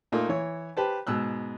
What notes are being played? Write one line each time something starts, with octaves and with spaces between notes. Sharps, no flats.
A#2 A3 A#3 D#4 F4
E3 C#5
G4 B4 C5 A5
G#2 B2 E6 F#6